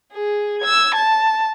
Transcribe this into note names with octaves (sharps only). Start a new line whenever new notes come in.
G#4
E6 G#6
A5